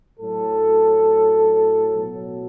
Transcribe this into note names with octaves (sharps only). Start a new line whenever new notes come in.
A2 F#3 A4
B2 F#3